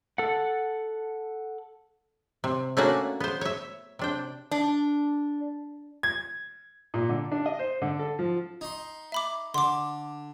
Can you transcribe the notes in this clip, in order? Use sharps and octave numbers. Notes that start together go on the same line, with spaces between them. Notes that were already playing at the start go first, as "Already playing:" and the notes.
A4 F#5
C3
A3 A#3 C#4 D4 F#4 F#5
B3 C5
C#5 E5
C3 D4 G5
D4
G#6
A#2
D3
D4
D#5
C5
D3
A4
F3
D#4 C6
E5 B5 D6
D3 C6 D6